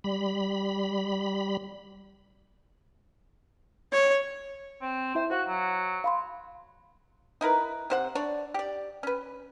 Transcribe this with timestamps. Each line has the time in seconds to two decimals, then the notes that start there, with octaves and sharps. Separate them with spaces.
0.04 G3 B5
3.92 C#5
4.82 C4
5.15 E4 C5 E5
5.30 F#4 C5 F5 F#5
5.48 F#3
6.04 F5 B5 C6
7.41 D#4 E4 A#4 B4
7.90 C3 C5 F#5
8.15 D4 C#5 D5
8.54 G4 D5
9.03 C#4 B4